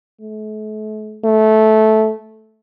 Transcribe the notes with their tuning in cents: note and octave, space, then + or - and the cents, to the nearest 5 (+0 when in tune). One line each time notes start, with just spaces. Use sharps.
A3 -40
A3 -15